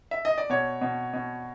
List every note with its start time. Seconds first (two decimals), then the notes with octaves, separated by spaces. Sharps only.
0.11 E5
0.25 D#5
0.38 D5
0.50 B2 C#5
0.81 B2
1.13 B2